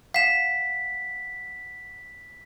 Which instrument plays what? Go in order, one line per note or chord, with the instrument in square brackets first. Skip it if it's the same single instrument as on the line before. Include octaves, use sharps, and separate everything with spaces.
[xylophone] F5 E7 [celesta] F#5 [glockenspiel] B6